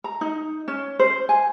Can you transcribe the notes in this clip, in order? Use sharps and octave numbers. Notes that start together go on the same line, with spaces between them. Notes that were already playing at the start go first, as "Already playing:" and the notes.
A#5
D#4
C#4
C5
G#5